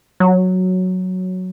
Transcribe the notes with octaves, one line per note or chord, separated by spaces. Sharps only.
F#3